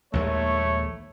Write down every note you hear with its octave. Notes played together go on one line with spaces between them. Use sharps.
A#1 D#2 G#3 A3 C#5